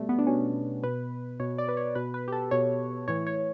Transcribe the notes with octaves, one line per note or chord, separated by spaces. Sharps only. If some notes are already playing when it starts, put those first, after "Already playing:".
Already playing: B2 G3 A3
B3
D4
B2 C#4
B2 B4
B2 C#5
D5
B4
C#5
B2 B4
B4
G4
A4
B2 C#5
A2 E3 C#5
C#5